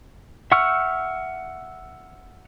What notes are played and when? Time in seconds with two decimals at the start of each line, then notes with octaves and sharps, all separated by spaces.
0.52 E5 F#5 C#6 E6 F6